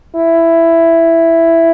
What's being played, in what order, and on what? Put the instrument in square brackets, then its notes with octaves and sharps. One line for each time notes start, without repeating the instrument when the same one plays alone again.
[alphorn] E4